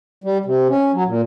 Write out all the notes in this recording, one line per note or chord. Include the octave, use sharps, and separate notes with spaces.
G3
C3
C#4
F#3
A#2